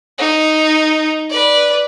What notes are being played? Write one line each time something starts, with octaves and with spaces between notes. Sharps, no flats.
D#4
B4 D5